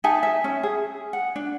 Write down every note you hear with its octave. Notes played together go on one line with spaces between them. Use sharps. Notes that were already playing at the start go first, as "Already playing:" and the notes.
D#4 E5 G#5 A5
E5
C#4
G#4
F#5
D4